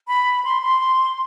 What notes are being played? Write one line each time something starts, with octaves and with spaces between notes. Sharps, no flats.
B5
C6
C6